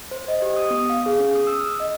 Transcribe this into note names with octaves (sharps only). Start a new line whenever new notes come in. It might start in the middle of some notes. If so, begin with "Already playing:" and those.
C5
D#5
G4
D#6
B3
F5
G#4
C#4
D#6
E6
F6
D#5